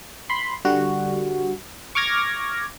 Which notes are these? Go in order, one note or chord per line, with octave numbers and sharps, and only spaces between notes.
B5 C6
D3 G3 F#4
C#6 D6 F6 G#6 A#6